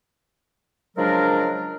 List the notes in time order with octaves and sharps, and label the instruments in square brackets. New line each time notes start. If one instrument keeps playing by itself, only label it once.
[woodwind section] C#3 F3 F#3 G#3 D4 A#4